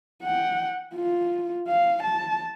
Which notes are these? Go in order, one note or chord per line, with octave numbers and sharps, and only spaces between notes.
F#5 G5
F4
F5
A5